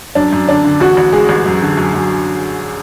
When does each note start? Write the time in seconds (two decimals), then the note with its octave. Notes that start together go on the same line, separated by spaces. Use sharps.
0.15 F#2 D4
0.32 F#2
0.48 D3 D4
0.65 D3
0.80 A1 F#4
0.97 A1
1.13 G#3 G#4
1.29 A1
1.46 F#2
1.62 D3
1.77 F#2
1.94 F#2